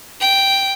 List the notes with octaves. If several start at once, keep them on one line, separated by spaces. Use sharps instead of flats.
G5